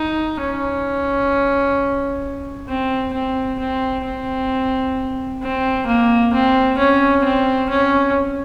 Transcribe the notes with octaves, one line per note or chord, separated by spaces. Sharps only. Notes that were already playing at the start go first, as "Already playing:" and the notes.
Already playing: D#4
C#4
C4
C4
C4
C4
C4
A#3
C4
C#4
C4
C#4